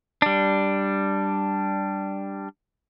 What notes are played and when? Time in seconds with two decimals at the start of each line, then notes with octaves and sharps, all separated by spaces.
0.22 G3 D4